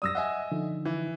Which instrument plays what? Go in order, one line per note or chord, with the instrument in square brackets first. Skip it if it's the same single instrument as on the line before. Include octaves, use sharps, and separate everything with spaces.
[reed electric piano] F#2 G3 D5 [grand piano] D#6 E6 A#6
[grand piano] D#5 E5 G#5 [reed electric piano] F#5
[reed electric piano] D3 F3 D#4
[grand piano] E3